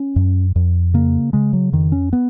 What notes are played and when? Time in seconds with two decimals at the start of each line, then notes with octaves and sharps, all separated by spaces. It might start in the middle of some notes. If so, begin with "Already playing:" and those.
Already playing: C#4
0.16 F#2
0.56 F2
0.94 C#3 A#3
1.33 C#3 G#3
1.53 F#3
1.72 F2 D#3
1.92 C#4
2.13 B3